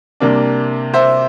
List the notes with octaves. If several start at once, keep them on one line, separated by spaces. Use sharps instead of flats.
C3 G3 A#3 D4
C5 E5